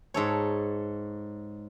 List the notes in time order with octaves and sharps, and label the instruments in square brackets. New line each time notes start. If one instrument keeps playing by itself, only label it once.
[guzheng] G#2 A4 C#5